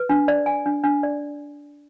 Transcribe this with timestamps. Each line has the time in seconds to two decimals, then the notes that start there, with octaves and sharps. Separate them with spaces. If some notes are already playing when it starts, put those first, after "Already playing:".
Already playing: B4
0.09 D4
0.28 D5
0.46 G#5
0.66 D4
0.84 D4
1.03 D5